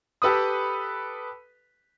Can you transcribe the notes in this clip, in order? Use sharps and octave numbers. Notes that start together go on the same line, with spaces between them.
G4 A4 B4 B5 D#6